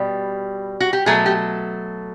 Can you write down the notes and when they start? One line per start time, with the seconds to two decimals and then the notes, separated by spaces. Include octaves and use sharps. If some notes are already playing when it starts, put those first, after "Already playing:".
Already playing: B2 G3
0.80 F#4
0.93 G4
1.06 B2 F#3 A3 G#4
1.26 G4